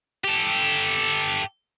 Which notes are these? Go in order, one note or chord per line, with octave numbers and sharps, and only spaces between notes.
G4 A4